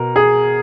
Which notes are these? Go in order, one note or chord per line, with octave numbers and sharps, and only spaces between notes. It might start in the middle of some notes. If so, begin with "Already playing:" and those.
Already playing: B2 A#4
G#4